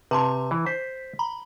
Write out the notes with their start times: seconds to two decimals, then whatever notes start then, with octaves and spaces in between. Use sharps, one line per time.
0.11 C3 B4 A5 C6
0.51 E3
0.66 C5 B6
1.19 A#5 B5